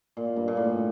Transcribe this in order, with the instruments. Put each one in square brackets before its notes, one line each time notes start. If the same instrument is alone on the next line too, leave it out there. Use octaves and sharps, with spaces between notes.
[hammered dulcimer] A#2
G2
A#2
A2